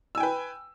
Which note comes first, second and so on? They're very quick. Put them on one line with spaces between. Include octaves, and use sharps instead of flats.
E6 G#5 G5 B4